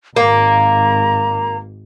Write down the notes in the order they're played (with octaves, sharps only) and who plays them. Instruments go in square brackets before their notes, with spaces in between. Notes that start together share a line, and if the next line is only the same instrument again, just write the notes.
[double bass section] G#1 [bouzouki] A#3 [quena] A#5